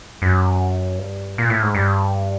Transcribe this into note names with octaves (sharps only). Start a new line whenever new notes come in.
F#2
G2
A#2
A2
G#2
G2